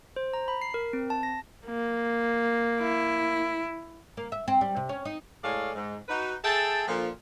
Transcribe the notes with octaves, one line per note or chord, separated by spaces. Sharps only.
C5
A#5
B5
C7
A#4
C4
A5
A#6
A#3
E4
A#3
E5
C4
G3
C3
C#4
D#4
A2 G#3 A4 C#5 D5 F5
G#2
D#4 F#4 B4
G#4 A4 E5 G5 A5
A#2 D3 F3